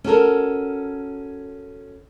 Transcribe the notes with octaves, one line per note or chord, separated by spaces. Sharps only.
C#4 F#4 A4 A#4